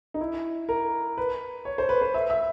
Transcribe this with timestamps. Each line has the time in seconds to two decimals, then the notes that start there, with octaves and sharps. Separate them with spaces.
0.14 D#4
0.21 E4
0.69 A#4
1.17 B4
1.65 C#5
1.78 C5
1.89 B4
2.01 C5
2.14 E5
2.30 E5